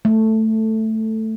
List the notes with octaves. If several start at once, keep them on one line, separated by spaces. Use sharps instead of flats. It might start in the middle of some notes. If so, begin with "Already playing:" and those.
A3